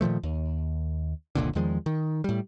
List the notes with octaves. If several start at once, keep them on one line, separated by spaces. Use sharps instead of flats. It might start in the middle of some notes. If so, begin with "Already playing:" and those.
A#2 D#3 F3 A3
D#2
F1 C#2 A#2 D3
E2 D#3 F3 G#3
D#3
A2 G3